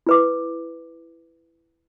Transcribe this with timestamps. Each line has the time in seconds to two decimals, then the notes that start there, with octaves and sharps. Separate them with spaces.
0.07 E4 B4 D6